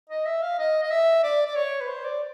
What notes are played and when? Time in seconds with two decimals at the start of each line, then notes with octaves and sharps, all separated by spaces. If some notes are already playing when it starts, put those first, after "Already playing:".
0.09 D#5
0.25 E5
0.42 F5
0.59 D#5
0.83 D#5
0.91 E5
1.23 D5
1.45 D5
1.56 C#5
1.81 B4
1.88 C5
2.04 D5